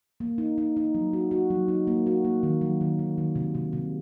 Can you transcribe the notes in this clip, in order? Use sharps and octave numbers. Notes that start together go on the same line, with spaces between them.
A#3
D#4
D#4
D#4
F#3
F#4
F#4
F#3
D#4
A#3
F#4
A#3
D#3
F#3
D#3
D#3
D#3
C3
C3
C3